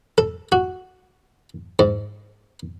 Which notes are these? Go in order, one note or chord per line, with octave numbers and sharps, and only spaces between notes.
A4
F#4
G#2